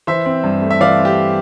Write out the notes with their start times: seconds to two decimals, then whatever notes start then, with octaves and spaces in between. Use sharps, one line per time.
0.07 E3 C5 E5
0.26 C4
0.44 G2
0.62 A3
0.70 E5
0.81 E3 D5 F5
0.99 C4
1.05 G4